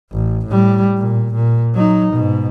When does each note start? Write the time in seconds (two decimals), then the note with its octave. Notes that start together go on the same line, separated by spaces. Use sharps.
0.12 A1
0.47 A2 G3
0.98 A#2
1.34 A#2
1.74 F#3 D#4
2.13 G#2 B2